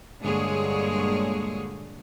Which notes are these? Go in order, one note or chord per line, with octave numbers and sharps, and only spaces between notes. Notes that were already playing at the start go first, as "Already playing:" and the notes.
G2 A#2 D3 G#3 G#4 C#5